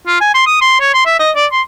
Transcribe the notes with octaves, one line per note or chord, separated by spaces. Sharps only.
F4
G#5
C6
D#6
C6
C#5
C6
E5
D#5
D5
C6